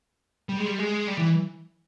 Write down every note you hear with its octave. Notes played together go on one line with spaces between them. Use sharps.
G3
G#3
G3
G#3
G3
E3